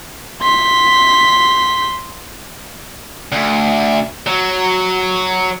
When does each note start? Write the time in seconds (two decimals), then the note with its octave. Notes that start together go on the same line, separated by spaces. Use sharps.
0.42 C6 B6
3.32 D2
4.27 F#3